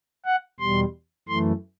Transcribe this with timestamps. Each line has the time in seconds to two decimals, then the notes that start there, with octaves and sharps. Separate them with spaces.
0.26 F#5
0.60 E2 B2 G3 C6
1.28 F#2 E3 A3 C6